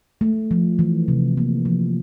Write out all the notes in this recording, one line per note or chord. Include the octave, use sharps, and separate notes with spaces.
A3
F3
E3
C3
A#3
F3